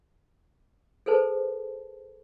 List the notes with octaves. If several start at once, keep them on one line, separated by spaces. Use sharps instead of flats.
G#4 A4 B4 C5 A5